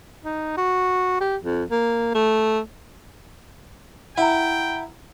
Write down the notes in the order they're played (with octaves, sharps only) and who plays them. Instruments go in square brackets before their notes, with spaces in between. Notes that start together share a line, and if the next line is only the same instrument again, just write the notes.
[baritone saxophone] D#4
F#4
G4
F2
A#3
A3
[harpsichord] E4 [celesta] F#5 A#5 [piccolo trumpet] G5